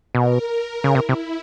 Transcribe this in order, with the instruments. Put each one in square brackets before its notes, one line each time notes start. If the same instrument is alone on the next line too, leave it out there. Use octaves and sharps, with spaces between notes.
[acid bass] B2 [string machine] A#4
[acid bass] C#3
[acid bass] C3 [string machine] E4
[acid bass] C3